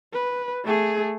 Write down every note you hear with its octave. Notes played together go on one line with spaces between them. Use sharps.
B4
A3 G#4